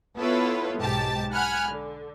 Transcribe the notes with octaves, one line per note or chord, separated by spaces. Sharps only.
B3 E4 F4 A4 B4 C#5
B1 G#2 G4 A5
F#5 G#5 B5 F6 F#6 G#6
D3